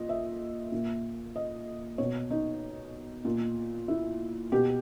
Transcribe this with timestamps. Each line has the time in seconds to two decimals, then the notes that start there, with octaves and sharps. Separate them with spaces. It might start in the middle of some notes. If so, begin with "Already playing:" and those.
Already playing: A#2 D#5
0.09 E5
0.72 A#2
1.36 D#5
1.98 B2 C#5
2.30 D#4
3.25 A#2
3.88 E4
4.52 B2 G4